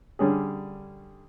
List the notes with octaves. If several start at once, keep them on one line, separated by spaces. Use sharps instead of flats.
D3 G3 C#4 G#4